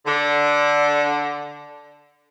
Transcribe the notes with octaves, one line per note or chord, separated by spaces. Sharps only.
D3